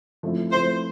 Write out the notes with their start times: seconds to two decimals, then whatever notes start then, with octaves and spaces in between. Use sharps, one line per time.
0.23 F3 A3 C4 E4
0.52 F3 A3 C4 E4 C5